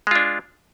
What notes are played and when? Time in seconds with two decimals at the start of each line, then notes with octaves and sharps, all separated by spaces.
0.07 G#3
0.11 F4
0.15 D4